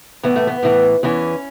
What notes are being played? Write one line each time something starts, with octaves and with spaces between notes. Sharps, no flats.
A2 E3 B3
A3
B3
A2 E3
E2 E3 C#4